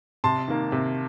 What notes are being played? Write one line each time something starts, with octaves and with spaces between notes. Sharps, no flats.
C3 A5 C6
D#3 A#3
C3